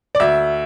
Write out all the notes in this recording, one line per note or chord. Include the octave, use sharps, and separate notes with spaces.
D5
D2 E5